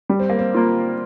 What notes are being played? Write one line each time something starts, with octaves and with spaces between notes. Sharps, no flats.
G3
C4
A#3
C4
A#3 F4